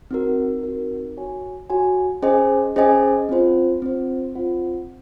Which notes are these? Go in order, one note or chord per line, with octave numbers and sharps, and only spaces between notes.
C4 D#4 F#4 A#4
C4 D#4 F#4 A#4
F#4 C#5 G#5
F#4 C#5 G#5
C#4 G#4 C5 D#5 G#5
C#4 G#4 C5 D#5 G#5
C4 F4 C5
C4 F4 C5
C4 F4 C5 F#5